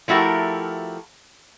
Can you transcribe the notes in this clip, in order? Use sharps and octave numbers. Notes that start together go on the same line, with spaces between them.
F3 A3 E4 F#4 G4 A#4